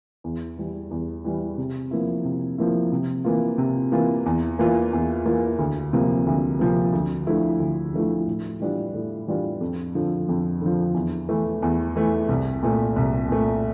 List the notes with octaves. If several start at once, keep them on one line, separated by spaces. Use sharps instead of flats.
E2
E3 G3
E2
E3 G3
C3
F3 A#3 E4
C3
F3 A#3 E4
C3
E3 A#3 F4
C3
E3 A#3 F4
E2
E3 A#3 F4
E2
E3 A#3 F4
D2
C3 F3 A#3
D2
C3 F3 A#3
D2
D3 F3 A3 E4
D2
D3 F3 A3 E4
A2
E3 G3 D4 F4
A2
E3 G3 D4 F4
F2
D3 F3
F2
D3 F3
E2
E3 A3
E2
E3 A3
C2
A#2 A3
C2
A#2 A3